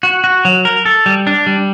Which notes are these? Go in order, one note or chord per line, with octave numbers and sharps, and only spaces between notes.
F#4
F#4
F#3
A#4
A4
G3
D4
G3